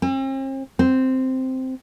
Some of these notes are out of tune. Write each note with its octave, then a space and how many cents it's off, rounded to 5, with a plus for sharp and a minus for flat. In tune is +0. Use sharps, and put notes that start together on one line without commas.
C4 +45
C4 -5